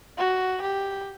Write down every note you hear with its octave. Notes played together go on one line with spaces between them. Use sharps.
F#4
G4